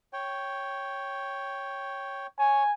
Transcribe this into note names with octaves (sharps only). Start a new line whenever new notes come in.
C#5 G5
C#5 G#5